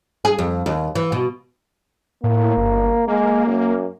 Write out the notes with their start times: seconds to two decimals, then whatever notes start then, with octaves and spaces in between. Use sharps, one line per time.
0.25 G#4
0.39 F2
0.66 D#2
0.95 E3
1.12 B2
2.24 A2 A#3
2.57 G1
3.08 G#3 A#3
3.47 F#2